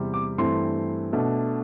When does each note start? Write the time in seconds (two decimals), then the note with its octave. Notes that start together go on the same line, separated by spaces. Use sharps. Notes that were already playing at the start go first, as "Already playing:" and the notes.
Already playing: E2 C3 G3
0.14 D6
0.38 G2 E3 A3 C4 C6
1.13 B2 A3 D4